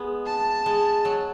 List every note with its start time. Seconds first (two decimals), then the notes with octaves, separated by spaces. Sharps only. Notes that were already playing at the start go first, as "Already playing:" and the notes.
Already playing: G#3 B3
0.26 A5
0.66 G#3
1.05 F#3